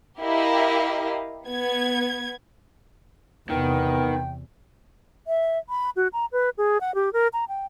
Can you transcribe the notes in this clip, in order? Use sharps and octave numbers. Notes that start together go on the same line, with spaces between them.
E4 G4 A#4 D#5 F5
B3 G#6
E2 C3 D#3 B3 G5
E5
B5
F#4
A#5
B4
G#4
F#5
G4
A#4
A#5
G5